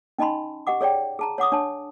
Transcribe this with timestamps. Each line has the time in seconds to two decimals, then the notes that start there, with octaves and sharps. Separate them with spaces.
0.18 C#4 D#4 D#5 A5 B5 C6
0.67 G4 D#5 F#5 D6
0.81 G#4 C#5 D5 G5
1.19 G#4 A5 A#5
1.38 C#5 F#5 D6 D#6
1.52 D4 C#5 A5